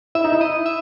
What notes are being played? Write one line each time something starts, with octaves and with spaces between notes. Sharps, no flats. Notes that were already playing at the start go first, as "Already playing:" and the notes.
E4 E5
D#4
E4
D#5
E5